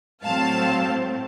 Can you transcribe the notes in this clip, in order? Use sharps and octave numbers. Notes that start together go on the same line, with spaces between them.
A2 F#3 C4 F5 A5